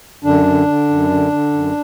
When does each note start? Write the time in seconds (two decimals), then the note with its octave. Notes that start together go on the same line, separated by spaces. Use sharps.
0.24 F#2 D3 D4
0.46 D3
0.67 D3
0.89 F#2
1.11 D3
1.32 D3
1.54 F#2